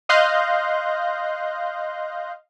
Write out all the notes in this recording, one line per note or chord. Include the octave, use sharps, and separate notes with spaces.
D#5 F5 C6 F#6 G6 A#6